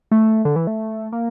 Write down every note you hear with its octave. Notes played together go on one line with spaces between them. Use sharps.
A3
D3
E3
A3
A#3